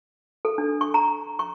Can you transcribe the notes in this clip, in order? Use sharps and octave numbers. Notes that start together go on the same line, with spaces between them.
A4
D4
C#6
A#5
C#6